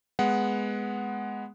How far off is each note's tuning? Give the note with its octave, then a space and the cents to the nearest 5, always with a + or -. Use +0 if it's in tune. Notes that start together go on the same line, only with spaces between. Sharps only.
G#3 +0 B3 +0 F#5 +0